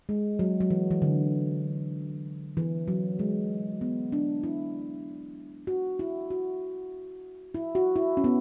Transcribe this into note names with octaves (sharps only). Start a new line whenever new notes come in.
G#3
F#3
F#3
E3
E3
D3
E3
F#3
G#3
B3
D4
E4
F#4
E4
F#4
E4
F#4
E4
C#4
B3